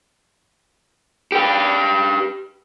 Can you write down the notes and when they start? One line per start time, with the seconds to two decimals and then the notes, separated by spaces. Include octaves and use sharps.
1.32 G4 B4